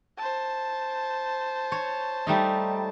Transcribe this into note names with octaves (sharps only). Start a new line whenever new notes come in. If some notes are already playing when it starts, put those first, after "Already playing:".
C5 A5
C#5
G3 A3 D#4